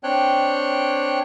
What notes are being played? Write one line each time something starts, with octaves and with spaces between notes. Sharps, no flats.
C4 D4 C#5 G5 F#6